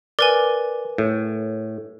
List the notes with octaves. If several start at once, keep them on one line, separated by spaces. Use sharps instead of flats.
A#4 B4 D5 G#5
A2